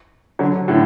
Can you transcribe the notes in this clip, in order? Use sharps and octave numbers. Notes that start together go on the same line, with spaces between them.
D3 F#3
A2 D3